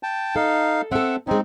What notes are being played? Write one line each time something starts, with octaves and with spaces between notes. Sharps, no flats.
G5 A5
D#4 A4 F5
C4 A4 E5 F#5
G#3 C4 C#4 D#4